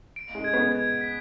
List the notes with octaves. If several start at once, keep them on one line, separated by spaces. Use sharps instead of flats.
D7
G#3
G#6
B3
G#6
B6